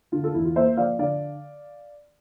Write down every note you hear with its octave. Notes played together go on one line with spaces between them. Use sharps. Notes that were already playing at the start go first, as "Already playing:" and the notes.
D3 F4
F4 A4
E2 E4
F4
A#3 C5 E5
F3 D5 F5
D3 D5 F5